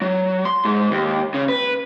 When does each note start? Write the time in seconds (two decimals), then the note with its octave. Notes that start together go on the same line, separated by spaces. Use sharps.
0.02 F#3
0.45 C6
0.65 G#2
0.91 D#2
1.34 C#3
1.49 B4